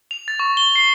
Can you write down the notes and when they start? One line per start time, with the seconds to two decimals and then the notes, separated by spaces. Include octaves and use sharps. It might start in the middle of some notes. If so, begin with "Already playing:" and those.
0.11 F7
0.28 A6
0.40 C#6
0.57 G7
0.76 C7